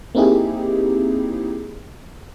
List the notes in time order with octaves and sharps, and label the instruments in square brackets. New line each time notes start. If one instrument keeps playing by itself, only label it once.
[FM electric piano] A#3 C4 D#4 E4 G4 G#4